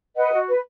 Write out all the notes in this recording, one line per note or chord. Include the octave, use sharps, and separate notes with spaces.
B4 D#5 F#5
F#4
B4